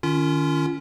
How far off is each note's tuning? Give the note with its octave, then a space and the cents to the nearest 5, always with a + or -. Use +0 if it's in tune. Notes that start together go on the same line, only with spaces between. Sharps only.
D#3 -30 C#4 +20 F4 -30